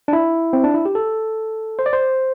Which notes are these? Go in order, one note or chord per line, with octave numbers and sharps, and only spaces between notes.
D4
E4
C4
D4
E4
G4
A4
C5
D5
C5